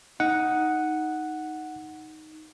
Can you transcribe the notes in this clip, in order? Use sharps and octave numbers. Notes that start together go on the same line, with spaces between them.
D#4 F#5